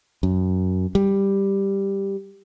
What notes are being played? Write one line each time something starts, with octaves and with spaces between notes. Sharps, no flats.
F#2
G3